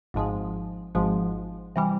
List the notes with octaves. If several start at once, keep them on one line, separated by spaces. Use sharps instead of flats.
G#1 G#2 F3 G#3
G#1 G#2 F3 G#3
C3 E3 G3